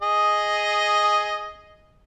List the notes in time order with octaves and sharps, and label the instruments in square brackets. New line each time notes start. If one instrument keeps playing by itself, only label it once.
[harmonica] G#4 D#5